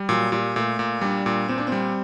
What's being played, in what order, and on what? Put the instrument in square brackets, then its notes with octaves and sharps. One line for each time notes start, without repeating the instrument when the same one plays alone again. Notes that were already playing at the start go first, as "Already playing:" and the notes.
Already playing: [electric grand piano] G3
[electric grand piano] A#2 [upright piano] F#3
[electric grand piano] A#2 [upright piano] G3
[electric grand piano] A#2 [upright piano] A3
[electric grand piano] A#2
[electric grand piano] G3 [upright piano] D4
[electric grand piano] A#2
[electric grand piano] A#2 [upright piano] C4
[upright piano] D4
C4
[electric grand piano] G3